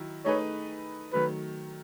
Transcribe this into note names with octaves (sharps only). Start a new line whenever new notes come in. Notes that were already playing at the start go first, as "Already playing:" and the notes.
Already playing: D#3 F#3 E4
A3 D#4 G#4 B4 C#5
D#3 F#3 A3 B4